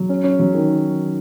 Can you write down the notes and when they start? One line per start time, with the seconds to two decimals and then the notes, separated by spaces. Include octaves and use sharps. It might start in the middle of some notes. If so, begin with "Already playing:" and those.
Already playing: F#3
0.09 C#4
0.24 C#4
0.40 F#3
0.55 D#3